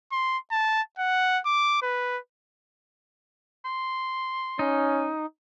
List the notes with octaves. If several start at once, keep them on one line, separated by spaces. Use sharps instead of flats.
C6
A5
F#5
D6
B4
C6
C#4 D#4